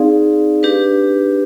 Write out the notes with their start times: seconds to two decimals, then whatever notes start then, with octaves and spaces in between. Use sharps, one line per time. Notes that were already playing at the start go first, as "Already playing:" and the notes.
Already playing: C4 D#4 G#4 D5 F5
0.63 D4 G4 B4